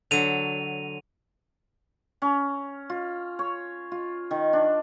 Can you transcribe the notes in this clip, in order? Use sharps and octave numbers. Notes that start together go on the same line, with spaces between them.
D3 F#3 D#7 F7
C#4
F4
C#5
F4
D#3
D4